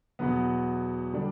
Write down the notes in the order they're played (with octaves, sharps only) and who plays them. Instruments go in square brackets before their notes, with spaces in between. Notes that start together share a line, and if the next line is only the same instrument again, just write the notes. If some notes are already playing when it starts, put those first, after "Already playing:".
[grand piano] E2 B2 F#3 B3
D3 G3 D4